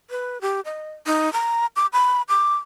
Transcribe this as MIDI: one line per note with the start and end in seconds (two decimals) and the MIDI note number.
0.10 0.41 71
0.41 0.60 67
0.65 0.92 75
1.07 1.33 63
1.33 1.66 82
1.76 1.86 86
1.93 2.22 83
2.29 2.55 86